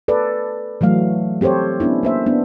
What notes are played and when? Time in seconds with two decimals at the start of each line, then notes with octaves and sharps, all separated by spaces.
0.08 A4 B4 D5
0.81 E3 F#3 A3 F5
1.41 C4 G4 A4 C5 C#5
1.80 B3 C#4 D4 E4
2.03 A#3 C5 E5
2.26 B3 D4